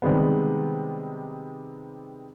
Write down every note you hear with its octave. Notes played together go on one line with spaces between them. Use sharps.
C3 D#3 G3 G#3 B3